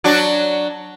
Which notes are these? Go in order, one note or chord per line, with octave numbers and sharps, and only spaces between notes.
F#3 D4 F#4